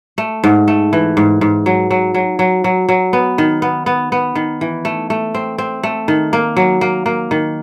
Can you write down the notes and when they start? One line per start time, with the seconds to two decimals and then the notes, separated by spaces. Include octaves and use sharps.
0.18 A3
0.44 G#2
0.68 A3
0.93 E3
1.17 G#2
1.41 G#2
1.66 F#3
1.91 F#3
2.14 F#3
2.39 F#3
2.64 F#3
2.89 F#3
3.13 B3
3.38 D#3
3.62 B3
3.86 B3
4.12 B3
4.35 D#3
4.61 E3
4.85 A3
5.10 A3
5.34 C4
5.58 C4
5.83 A3
6.08 D#3
6.33 A#3
6.57 F#3
6.81 A#3
7.06 A#3
7.31 D#3